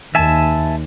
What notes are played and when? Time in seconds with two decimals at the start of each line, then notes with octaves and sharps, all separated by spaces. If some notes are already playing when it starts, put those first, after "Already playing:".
0.15 D#2 E5 G#5 A5